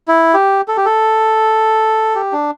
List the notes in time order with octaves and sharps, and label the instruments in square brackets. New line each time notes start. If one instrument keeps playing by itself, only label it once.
[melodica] E4
G4
A4
G4
A4
G4
D4